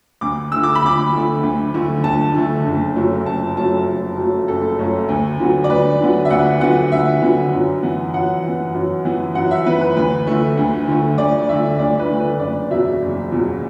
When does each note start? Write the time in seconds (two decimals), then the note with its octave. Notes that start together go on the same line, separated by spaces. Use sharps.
0.21 D2 D6
0.52 D3 A3 E6
0.63 D6
0.75 B5
0.83 D2 D6
1.13 D3 A3
1.43 D2
1.74 D3 A3
2.04 D2 A5
2.35 D3 A3
2.66 F#1
2.96 F#2 F#3 A3
3.26 F#1 A5
3.56 F#2 F#3 A3 A5
3.87 F#1
4.17 F#2 F#3 A3
4.48 F#1 A4
4.79 F#2 F#3 A3
5.09 D2
5.39 D3 F#3 B3
5.64 D5
5.70 D2 B4
6.00 D3 F#3 B3
6.25 E5
6.30 D2 F#5
6.61 D3 F#3 B3 F#5
6.92 D2 E5
7.22 D3 F#3 B3
7.53 F#2
7.83 E3 B3
8.14 F#2 F#5
8.44 E3 B3
8.75 F#2
9.05 E3 B3
9.35 F#2 F#5
9.51 E5
9.66 B3 B4
9.69 E3
9.81 B4
9.97 D2 B4
10.27 D3 A3
10.57 D2
10.88 D3 A3
11.18 D2 D5
11.49 D3 A3 E5
11.79 D2 D5
11.99 B4
12.09 D3 A3
12.20 B4
12.40 F#1 D5
12.70 E2 B2 F#3 E5
13.02 F#1
13.32 E2 B2 F#3